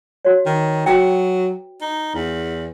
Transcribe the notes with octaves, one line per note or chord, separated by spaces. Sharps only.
F#4 C#5
D#3
F#3 F#4 B4 G5
D#4
E2